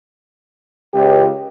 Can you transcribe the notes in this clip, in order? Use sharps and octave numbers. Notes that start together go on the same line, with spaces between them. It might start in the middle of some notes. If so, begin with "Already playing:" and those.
C#2 G4